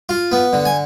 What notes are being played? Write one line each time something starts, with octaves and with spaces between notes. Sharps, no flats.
F4
B3
D3
G#5